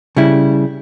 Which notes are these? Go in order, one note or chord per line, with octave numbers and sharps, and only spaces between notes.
C#3 G3 E4